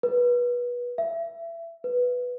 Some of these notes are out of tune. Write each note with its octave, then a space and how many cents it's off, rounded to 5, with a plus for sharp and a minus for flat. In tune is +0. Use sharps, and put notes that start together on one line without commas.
B4 -25
E5 +25
B4 +0